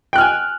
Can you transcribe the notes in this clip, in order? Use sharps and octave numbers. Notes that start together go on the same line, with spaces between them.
G5 G#5 F6 F#6